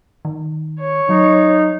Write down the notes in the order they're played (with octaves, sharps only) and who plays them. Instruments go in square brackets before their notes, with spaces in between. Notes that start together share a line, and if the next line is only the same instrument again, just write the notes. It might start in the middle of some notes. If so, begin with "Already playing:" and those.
[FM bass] D#3
[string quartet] C#5
[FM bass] F#3 [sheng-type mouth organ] D#4